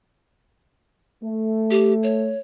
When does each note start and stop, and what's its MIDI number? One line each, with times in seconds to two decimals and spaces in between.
1.23 2.34 57
1.71 1.93 67
2.03 2.39 73